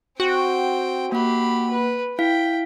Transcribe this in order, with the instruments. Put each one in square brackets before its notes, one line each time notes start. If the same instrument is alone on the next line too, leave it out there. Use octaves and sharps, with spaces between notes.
[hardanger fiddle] C4 G5 [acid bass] F#4
[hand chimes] A#3 F#5 [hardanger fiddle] G4 B5
[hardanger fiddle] B4
[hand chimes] E4 F5 B6 [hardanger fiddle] G5